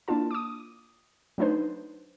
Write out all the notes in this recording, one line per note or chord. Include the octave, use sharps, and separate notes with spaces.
A#3 D4 E4 F4 A5
D6 D#6
F#3 A3 D4 D#4 B4 C5